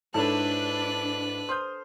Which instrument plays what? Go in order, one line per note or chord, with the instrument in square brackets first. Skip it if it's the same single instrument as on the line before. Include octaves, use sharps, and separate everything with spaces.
[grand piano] G#2 E4 C#5 [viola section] D4 [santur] A4 [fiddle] B4 F#6
[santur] C5 [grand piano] D#6 F6 G6